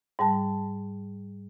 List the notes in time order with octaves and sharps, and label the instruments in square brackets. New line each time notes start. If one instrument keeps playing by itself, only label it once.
[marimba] G#2 G3 A5